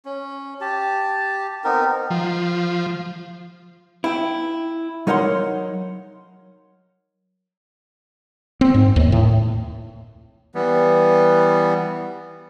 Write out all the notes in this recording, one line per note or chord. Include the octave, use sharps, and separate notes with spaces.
C#4
G4 A5
B3 C4 D#4 A#4
F3
E4 G5
F#3 D#4 A#4 C#5 F#5 C6
C4
G#2
D#2
A2
E3 G3 B3